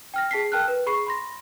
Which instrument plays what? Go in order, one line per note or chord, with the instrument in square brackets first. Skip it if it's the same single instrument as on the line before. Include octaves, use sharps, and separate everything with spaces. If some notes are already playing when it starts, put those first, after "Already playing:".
[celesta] G5 F6 A#6
G#4 A5 B6 C7
A#4 G5 A5 F6 F#6
B4
G#4 B5 C#6 C7
B5 C6 A#6